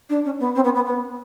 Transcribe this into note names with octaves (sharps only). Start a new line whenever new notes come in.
D4
C#4
B3
C4
B3
B3
B3